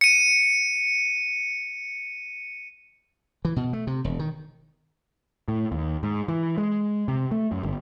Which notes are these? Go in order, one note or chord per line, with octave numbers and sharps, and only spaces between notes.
C#7 D#7
E3
B2
A3
C3
E1
D#3
A2
D#2
G#2
E3
G#3
C3
A3
F#2
G1